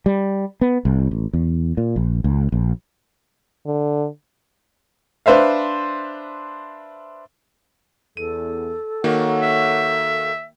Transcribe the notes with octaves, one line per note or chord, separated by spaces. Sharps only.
G3
B3
C2
A1
E2
A#2
A#1
C#2
A#1
D3
D4 B4 C5 E5 F5
E2 A4 D#7
D#3 A#3 F#4 C#5 F#5
E5